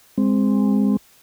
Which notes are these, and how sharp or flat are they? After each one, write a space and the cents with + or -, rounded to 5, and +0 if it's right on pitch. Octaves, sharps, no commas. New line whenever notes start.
G#3 -25 C4 +0